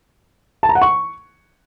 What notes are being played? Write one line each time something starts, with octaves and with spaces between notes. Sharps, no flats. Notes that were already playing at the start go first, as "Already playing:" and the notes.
A5
A#5
F#5
C#6